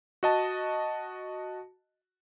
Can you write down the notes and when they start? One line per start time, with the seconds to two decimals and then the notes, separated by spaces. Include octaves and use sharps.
0.23 F#4 D#5 A5